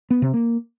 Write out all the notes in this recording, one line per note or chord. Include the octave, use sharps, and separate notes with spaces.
B3
C3
A#3